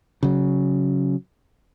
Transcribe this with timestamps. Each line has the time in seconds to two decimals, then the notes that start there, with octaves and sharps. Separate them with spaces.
0.23 C#3 F#3